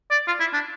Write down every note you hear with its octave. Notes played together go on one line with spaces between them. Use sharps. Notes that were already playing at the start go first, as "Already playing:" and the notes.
D5
F4
E4
D4